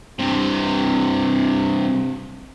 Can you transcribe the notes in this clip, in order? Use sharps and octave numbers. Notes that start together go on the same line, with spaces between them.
G2 C3